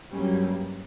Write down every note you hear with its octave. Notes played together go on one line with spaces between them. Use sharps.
G2 F#3 G3 A#3 C#4